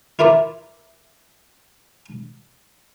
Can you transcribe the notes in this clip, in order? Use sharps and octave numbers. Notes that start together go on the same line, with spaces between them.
E4 F4 A#4 D5 E5